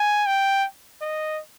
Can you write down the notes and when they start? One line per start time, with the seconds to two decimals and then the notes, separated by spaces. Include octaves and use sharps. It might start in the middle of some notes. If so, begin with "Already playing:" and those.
Already playing: G#5
0.26 G5
1.01 D#5